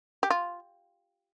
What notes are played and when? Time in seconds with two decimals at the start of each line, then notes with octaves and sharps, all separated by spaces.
0.23 G4
0.30 F4